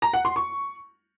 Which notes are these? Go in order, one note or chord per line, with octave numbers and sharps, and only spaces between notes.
A#5
F#5
C6
C#6